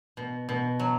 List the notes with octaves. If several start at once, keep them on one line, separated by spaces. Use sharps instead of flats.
B2
B2
F#3